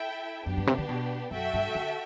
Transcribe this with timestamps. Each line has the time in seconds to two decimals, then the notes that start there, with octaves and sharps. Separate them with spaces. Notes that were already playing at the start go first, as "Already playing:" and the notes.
Already playing: E4 A4 E5 G5
0.46 F#2 B3 D4 G4
0.57 G2
0.67 C3
0.78 D3
0.89 B2
1.31 F#2 F#4 A4 E5 G5
1.54 G2
1.75 D3